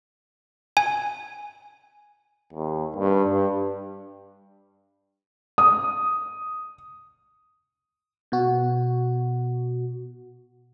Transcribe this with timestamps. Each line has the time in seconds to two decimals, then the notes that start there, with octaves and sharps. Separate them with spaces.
0.77 G#5
2.53 D#2
2.96 G2
3.29 G2
5.58 D#6
8.32 B2 F#4